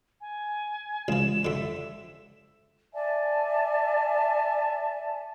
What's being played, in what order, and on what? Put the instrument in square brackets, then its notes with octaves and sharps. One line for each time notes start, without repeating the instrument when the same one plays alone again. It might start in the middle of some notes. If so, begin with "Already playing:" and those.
[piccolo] G#5
[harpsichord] C#2 F3 [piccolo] E7
[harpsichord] F2 D3 [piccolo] E5
[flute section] D5 E5 G#5 A5